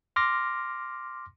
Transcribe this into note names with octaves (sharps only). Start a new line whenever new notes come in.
C6 D6 F6 A#6